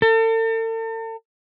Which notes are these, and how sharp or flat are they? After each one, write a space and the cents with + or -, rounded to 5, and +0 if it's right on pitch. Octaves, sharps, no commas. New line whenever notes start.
A4 +40